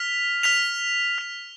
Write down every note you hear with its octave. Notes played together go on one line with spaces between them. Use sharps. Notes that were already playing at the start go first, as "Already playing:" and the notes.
Already playing: F6 B6 F7
F6 B6 F7
F6 B6 F7